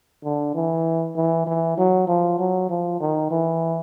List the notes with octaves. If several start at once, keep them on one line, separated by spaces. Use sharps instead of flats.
D3
E3
E3
E3
F#3
F3
F#3
F3
D#3
E3